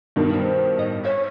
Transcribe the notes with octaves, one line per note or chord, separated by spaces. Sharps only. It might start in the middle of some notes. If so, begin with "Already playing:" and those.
G2 B2 D#3
G3 C4
A2 D#4 D#5
C#5 E5